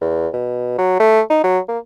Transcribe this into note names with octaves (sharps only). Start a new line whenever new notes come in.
E2
B2
F#3
A3
D#4
F#3
A#3